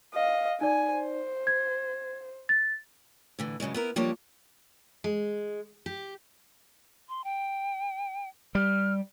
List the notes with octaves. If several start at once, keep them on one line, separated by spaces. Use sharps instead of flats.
D#5 F5
D#4 D5 G#5
C5
G#6
A6
A2 D3 E3
G2 C#3 F#3 G#3
B3 E4 A#4
F3 G3 A#3 D4 A4 C#5
G#3
G4
C6
G5
G3 F6